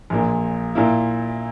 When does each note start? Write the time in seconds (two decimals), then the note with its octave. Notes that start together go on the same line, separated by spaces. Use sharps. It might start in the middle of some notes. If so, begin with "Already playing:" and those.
0.10 A#1 A#2 A#3
0.75 A#2 A#3 E4